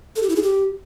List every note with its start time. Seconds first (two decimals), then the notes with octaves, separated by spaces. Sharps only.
0.16 A4
0.23 G4
0.29 E4
0.36 G#4
0.43 G4